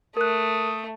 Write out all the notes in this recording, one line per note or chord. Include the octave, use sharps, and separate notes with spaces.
A3 A#4 D#6 F#6